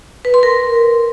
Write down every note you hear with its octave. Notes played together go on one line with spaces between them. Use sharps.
B4
C6
A#4